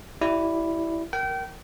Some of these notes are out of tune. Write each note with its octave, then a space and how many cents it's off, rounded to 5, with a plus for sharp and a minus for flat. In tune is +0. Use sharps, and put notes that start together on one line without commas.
E4 +0 G4 -40 D5 +0
A#4 +0 G5 -30